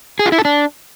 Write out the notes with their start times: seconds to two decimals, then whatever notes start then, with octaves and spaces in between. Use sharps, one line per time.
0.19 G#4
0.26 F4
0.32 E4
0.38 A4
0.45 D4